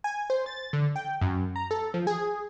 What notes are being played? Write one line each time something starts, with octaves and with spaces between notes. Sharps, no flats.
G#5
C5
A6
D3
G5
F#2
A#5
A4
F3
G#4